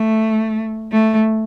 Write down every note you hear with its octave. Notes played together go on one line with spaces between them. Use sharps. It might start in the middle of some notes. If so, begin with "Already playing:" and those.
Already playing: A3
A3